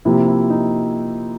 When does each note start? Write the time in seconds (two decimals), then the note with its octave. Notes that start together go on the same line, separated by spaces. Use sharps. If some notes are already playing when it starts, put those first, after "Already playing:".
0.05 C3 F3 A#3 E4
0.28 E4
0.50 D#4